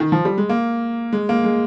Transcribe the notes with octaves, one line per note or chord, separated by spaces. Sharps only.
D#3
F3
G3
G#3
A#3
G#3
A#3
G#3